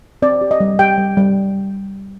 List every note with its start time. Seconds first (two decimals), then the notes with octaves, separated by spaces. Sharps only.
0.22 C4 D5
0.41 G4
0.51 D#5
0.60 G3
0.79 G4 G5
0.97 G3
1.17 G3